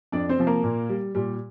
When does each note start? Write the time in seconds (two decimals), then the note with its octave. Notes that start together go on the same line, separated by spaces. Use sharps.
0.12 F2 D4 D5
0.29 C4 C5
0.38 C3 F3
0.47 A#3 A#4
0.64 A#2
0.89 G3
1.15 A#2 G3 G4